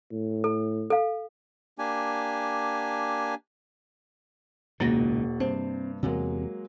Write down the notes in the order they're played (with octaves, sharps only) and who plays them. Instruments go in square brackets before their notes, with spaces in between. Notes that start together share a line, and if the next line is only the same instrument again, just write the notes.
[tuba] A2
[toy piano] A4
A4 F5
[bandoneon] A#3 D4 G4 G#5
[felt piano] E1 F#4 A6 [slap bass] C#2 A#2 D#3 [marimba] A#3 A#6
[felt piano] G2 C3 [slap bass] C4 [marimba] C5
[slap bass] E2 C3 [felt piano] F#3 G#3 A#3